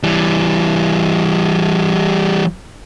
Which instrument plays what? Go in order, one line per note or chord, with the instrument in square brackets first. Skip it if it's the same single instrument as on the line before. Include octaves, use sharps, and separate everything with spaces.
[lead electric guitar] E3 G3